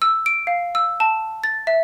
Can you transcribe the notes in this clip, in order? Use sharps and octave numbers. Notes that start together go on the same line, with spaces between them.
E6
D7
F5
E6
A5
A6
E5